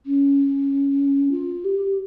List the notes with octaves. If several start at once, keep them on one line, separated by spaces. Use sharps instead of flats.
C#4
F4
G4